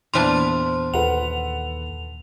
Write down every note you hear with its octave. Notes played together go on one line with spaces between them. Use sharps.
E2 A#2 E3 D4 C5 C6
D#2 A4 B4 F#5 F7